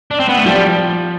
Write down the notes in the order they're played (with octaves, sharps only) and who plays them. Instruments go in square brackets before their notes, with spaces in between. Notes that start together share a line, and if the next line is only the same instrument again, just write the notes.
[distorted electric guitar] D4
C4
B3
A3
[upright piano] F3 [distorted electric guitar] G3